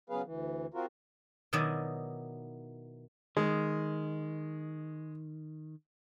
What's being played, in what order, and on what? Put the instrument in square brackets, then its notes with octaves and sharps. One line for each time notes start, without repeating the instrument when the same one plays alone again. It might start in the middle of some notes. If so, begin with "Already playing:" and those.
[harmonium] C#3 F#3 B3 G#4 B4 F5
D2 E3
C4 F4 F#4 A#4
[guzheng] B2 D#3 F#3 E4 D5 D#5
[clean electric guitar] D#3 [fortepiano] G#3